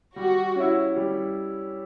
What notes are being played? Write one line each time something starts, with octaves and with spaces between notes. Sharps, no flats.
G3 F#4
C#4 E4
G3